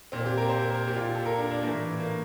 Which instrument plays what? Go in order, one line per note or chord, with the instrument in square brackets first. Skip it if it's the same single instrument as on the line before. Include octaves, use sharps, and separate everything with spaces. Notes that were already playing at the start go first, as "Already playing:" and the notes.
[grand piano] A#2 C4
G4
A#4
C5
A#4
A#2 G4
F4
A4
A#4
D4
D4
A2 E3 A#3
A#3